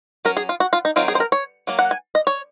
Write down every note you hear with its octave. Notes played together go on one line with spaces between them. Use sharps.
F#3 C#4 A#4
G#4
F4
F#4
F4
D#4
D#3 F#3 C4 D#4 F4
G#4
C5
A#4
C#5
F#3 A#3
F#5
G#5
D#5
C#5